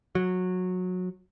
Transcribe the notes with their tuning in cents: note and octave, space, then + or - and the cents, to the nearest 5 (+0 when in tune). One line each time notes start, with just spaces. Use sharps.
F#3 -20